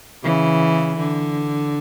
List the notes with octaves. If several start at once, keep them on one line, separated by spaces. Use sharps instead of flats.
C#3 E3
D3